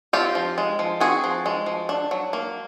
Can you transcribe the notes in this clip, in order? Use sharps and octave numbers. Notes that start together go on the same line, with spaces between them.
C4 F4 G4
F3
G#3
F3
C4 F#4 G#4
F3
G#3
F3
D4
F#3
A#3